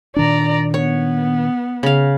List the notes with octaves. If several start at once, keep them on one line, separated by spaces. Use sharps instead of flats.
A#2 D#3 D4 D5 A#5
B3 C#5
C#3 F5